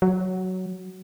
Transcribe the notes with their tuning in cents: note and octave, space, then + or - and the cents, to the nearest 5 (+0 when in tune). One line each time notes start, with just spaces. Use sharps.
F#3 +5